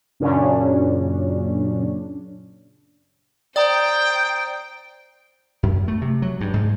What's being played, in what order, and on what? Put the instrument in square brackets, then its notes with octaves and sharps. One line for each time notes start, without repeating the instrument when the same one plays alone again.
[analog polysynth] F#2 A#2 C#3 C#4 D4
[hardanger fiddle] C5 [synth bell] D5 [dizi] G5 [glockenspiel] A#5 D#6 A6
[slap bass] F#2
A3
C3
F#3
G2
G#2